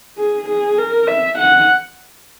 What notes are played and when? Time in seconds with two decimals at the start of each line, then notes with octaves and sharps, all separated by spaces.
0.18 G#4
0.49 G#4
0.78 A#4
1.08 E5
1.39 F#5